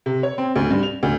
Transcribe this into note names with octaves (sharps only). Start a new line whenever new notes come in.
C3
C#5
C4
D2
G2
F7
D2